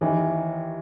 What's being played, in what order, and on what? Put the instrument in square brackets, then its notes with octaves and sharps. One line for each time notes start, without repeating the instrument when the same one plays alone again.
[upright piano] D#2 D#3 E3